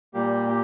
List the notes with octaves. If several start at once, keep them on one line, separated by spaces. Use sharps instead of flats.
A#2 G3 A#3 G4
G4